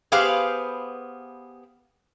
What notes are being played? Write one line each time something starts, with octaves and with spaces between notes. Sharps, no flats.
B3 G4 G#4 B4 C5 F5